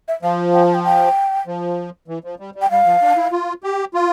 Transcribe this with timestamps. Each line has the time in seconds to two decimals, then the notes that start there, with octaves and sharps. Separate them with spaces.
0.08 E5
0.23 F3 F5
0.54 G5
0.64 A5
0.74 G5
0.84 G5
1.47 F3
2.08 E3
2.24 F3
2.40 G3
2.55 G3
2.62 G5
2.71 G3 F5
2.86 F3
3.02 D4
3.16 E4
3.32 F4
3.63 G4
3.94 F4